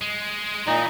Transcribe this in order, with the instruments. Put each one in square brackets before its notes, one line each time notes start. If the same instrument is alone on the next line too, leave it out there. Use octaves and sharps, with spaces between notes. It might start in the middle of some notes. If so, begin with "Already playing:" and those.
[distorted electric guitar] G#3
[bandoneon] A#2 D#4 D#5 [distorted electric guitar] E3